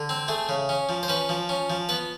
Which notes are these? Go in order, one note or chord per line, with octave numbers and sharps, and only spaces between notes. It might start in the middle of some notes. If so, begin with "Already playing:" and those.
Already playing: D3
C4
A3 G#4
C#3
C#4
F3
C5
C#4 B4
F3
C#4
F3
B3 B4